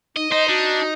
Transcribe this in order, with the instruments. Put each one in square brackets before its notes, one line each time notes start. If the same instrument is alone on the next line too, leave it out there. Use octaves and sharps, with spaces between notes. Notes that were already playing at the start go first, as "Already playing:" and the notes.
[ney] D#4 [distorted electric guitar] D#5
[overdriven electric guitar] D#4 [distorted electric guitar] C5 [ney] D#5
[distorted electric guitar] D4 [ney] F#4